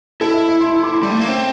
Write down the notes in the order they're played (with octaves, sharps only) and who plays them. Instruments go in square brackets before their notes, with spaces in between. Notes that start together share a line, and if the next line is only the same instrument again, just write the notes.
[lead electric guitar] E4 [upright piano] A4
[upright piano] E5
E5
C6
E6
D6
C6
[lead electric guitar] G3 [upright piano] D6
[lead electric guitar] A3
A#3
C4